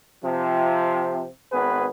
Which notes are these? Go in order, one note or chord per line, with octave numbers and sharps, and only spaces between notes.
C3 F3
G#1 B3 G#4 B4